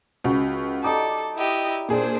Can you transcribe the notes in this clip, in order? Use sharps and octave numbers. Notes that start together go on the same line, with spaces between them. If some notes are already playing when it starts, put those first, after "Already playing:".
C#2 F#4
G3 D#4 A4 D6
E4 G4 D#5
A#2 D4 G#4 C5